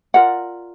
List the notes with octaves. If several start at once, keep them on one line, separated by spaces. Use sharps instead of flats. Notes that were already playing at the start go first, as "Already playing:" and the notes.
F4 A#4 D5 F#5